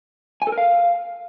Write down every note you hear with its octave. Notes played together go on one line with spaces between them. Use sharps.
G#5
A4
A#4
F5